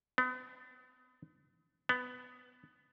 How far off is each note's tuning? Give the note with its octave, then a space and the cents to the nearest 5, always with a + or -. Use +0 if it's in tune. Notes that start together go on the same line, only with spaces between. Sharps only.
B3 +40
B3 +15